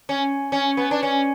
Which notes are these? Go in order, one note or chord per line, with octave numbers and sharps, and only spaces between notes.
C#4
C#4
B3
D4
C#4